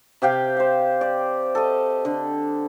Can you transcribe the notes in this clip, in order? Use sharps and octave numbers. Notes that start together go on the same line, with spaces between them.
C3 G4 F5 G5
C5 F5
D5
A4 D#5
D3